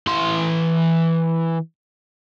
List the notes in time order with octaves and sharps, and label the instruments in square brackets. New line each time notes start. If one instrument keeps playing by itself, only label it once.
[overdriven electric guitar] E3 C6